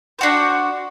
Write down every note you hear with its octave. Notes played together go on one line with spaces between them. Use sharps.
D4 F#4 C5